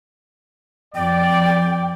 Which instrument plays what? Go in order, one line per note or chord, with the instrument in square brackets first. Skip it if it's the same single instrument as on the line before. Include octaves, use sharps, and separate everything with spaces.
[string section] F2 [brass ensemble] D5 [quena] G5